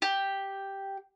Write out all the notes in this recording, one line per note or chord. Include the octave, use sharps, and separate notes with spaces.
G4